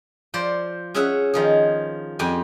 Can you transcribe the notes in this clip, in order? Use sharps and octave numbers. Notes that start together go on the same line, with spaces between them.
F3 C5 D5
C#4 G#4 C#5 E5 F#5
D#3 F3 G#4
F2 G4 G#5